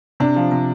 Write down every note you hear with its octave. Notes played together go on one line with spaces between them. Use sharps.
C3 D4
F3
C3